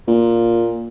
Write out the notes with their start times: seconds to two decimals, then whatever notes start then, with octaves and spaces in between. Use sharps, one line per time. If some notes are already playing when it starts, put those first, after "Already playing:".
0.07 A#2